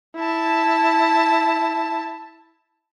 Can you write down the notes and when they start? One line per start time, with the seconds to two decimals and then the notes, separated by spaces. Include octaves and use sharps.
0.16 E4 A5